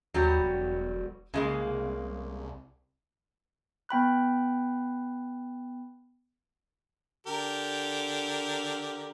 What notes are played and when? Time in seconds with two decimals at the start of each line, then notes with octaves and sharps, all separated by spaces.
0.14 D#2 F#3 G3 F#4
0.39 E1
1.34 C2 C#3 G#3 A#3
3.89 B3 G5 B5 F#6
7.27 D3 G4 A#4